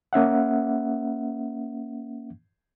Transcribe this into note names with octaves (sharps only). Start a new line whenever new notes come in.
A#3 C#4 E5 F#5